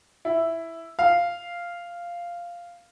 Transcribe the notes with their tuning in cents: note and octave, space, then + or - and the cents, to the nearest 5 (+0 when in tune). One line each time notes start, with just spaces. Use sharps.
E4 +0
F5 -5